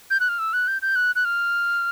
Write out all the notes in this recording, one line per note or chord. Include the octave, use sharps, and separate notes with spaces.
G6
F#6
F6
E6
F#6
G6
G6
F#6
F#6
F6